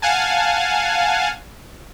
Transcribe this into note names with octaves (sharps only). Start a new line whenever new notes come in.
F5 F#5 G#5 A5